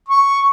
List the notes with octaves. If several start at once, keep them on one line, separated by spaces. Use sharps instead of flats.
C#6